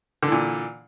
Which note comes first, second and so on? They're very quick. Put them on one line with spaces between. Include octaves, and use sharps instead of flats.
D3 E3 A#2